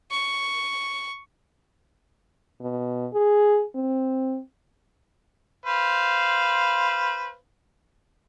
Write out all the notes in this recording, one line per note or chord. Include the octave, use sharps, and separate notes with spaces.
C#6
B2
G#4
C4
B4 C5 F5